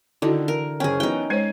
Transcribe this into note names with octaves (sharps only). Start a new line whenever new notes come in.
D3 D#3 D#4 E4 F#4 A4
E3 A#4
F#1 C#4 G#4 G5
E3 F#3 B3 D#4 G5
G#3 C5 C#5 G#6 C7 D#7